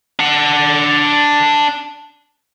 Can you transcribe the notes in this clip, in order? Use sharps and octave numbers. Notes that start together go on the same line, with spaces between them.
D4 F#5